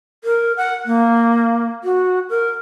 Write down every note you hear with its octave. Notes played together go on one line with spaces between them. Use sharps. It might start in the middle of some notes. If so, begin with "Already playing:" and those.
A#4
F#5
A#3
F#4
A#4